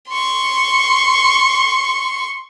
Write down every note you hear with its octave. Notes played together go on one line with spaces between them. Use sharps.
C6 C#6